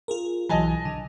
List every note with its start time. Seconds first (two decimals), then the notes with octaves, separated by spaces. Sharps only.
0.08 F4 G#4 A#4
0.49 B1 E3 F#3 D#5 G#5 A5
0.85 D3